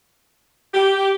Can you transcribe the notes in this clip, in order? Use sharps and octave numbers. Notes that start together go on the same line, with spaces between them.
G4